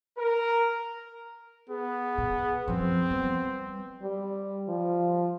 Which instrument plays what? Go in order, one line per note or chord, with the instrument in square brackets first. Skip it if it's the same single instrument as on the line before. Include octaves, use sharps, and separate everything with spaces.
[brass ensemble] A#4
[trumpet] B3 [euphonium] G#4
[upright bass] B2
[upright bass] F#2 F3 [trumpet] C4
[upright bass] G3 [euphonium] B3
[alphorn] G3
F3